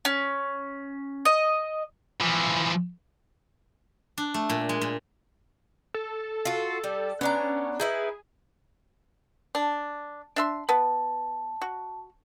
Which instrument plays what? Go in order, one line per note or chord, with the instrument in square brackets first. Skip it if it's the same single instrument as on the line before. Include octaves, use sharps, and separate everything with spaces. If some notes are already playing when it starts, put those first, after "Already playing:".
[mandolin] C#4
D#5
[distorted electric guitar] E3 F3
[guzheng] D4
A3
A#2
G#3
A#2
[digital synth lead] A4
[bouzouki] F4 F#4
G3
[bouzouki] B3 D4 A#5 [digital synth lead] C#4
[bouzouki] D#4 E4 B4 [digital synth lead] G#4
[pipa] D4
D4 E5 C6
[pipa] B3 B4 [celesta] A5
[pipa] F#4